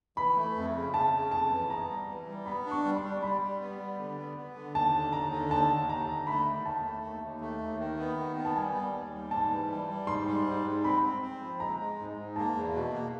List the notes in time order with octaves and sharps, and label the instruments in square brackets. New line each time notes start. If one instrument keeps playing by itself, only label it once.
[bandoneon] E3 [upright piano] B5
[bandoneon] A3
F2
C#3
[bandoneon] C#3 [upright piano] A5
[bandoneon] C#3
[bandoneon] F2 [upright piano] A5
[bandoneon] E3
[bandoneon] B3 [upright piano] A#5
[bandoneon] G3
E3
G3
[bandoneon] B3 [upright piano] B5
[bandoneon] D4
[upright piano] C#6
[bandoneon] G3
[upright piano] C6
[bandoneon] G3
[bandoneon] G3 [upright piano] B5
[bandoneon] G3
B3
G3
D3
B3
B3
D3
[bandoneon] D#2 [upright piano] A5
[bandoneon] D3
[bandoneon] D#2 [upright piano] A#5
[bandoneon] D3
[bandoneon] D#2 [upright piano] A5
[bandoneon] D#2
[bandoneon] D#2 [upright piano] A#5
[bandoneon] D3
[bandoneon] A3 [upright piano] B5
[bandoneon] D#3
[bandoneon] D#2 [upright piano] A5
[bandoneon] A3
D#2
D#2
A3
D#2
D#3
B3
D#3
B3
[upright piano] A5
[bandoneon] G3 [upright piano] G#5
[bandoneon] G3
D#2
G3
[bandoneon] G#2 [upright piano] A5
[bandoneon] E3
G3
G3
[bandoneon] G#2 [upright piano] C6
[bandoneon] G3
G#2
G#2
[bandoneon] C4 [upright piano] B5
[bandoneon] C4
C4
F3
[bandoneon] G#3 [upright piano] A#5
[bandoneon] G#3
G#2
G#2
[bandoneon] A#3 [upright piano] A5
[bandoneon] E2
B2
A#3